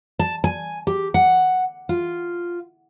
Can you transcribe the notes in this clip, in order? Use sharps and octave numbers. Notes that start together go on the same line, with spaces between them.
A5
G#5
G4
F#5
F4